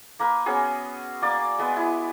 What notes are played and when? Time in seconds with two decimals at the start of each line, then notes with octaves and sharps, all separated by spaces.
0.19 A#3 A#4 B4
0.46 B3 C#4 F#4 G#4
1.22 A#3 D5
1.59 G#3 B3 B4
1.76 E4